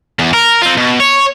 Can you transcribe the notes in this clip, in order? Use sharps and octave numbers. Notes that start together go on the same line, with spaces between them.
E2
A#4
C4 F4
B2
C#5